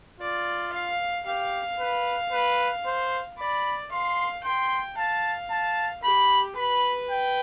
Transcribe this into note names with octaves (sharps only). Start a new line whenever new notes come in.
F4 D5
F5
G4 F5
B4
B4
C5
D5 B5
F5 C6
G5 C6
F5 A5
A5
G4 B5
B4 B5
G5